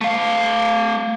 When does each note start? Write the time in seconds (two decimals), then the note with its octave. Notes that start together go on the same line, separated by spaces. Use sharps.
0.01 A3 F5